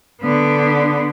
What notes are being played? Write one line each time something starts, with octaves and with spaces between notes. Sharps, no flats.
D3 B3